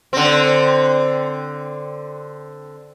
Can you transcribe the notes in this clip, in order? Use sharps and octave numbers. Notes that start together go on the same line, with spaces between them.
D3 C4